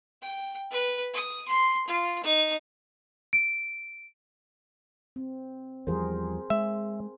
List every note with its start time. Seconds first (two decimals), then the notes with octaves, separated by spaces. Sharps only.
0.22 G5
0.71 B4
1.14 D#6
1.48 C6
1.87 F4
2.23 D#4
3.33 D7
5.16 C4
5.87 E2 F3 G3 G#4 A#4 C5
6.50 G#3 E5